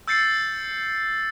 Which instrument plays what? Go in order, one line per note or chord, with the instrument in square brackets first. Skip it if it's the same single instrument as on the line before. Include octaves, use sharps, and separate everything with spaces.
[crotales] E6 G6 A6 C7 C#7